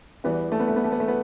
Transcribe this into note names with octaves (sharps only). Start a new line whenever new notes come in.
E2 E3 G3 B3
A3
B3
A3
B3
A3
B3
A3
B3